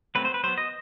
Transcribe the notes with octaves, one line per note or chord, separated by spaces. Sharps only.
F#3 A3 C4 B4
C5
B4
F#3 B3 C5
D#5